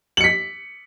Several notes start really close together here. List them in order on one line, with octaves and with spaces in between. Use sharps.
F#7 C#7 B6